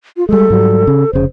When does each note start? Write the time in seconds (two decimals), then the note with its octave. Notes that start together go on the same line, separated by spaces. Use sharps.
0.17 F4
0.29 G3 G#3 A4
0.50 G#2 F#3 G3
0.87 C#3
1.13 F1 C#3 C5